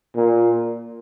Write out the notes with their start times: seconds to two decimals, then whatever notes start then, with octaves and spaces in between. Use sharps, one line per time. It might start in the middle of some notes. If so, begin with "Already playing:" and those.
0.16 A#2